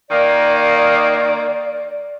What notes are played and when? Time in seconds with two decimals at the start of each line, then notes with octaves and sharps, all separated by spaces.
0.10 D#3 A#3 D5